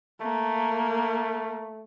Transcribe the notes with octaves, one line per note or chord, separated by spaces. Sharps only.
A3 A#3